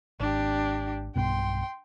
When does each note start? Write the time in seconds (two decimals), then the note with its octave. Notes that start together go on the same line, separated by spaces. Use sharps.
0.20 G#1 D4 G4
1.16 B1 G2 B2 G5 C6